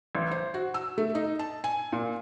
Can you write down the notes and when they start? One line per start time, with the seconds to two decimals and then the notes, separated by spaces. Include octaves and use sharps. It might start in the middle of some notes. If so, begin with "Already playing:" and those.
0.15 A1
0.31 C5
0.54 F#4
0.74 E6
0.98 A3
1.15 D#4
1.39 A5
1.64 G#5
1.93 A#2